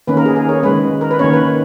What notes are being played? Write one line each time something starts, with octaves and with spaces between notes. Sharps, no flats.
D#3 A#3 C#4 B4
A#4
G#4
G#4
C#5
D#3 G#3 C#4 B4
A#4
B4
D#3 A#3 C#4 C#5
B4